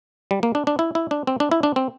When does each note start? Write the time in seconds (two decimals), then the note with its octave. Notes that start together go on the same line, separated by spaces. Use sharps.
0.31 G3
0.43 A#3
0.55 D4
0.67 D4
0.79 E4
0.95 E4
1.11 D4
1.27 C4
1.40 D4
1.52 E4
1.63 D4
1.76 C4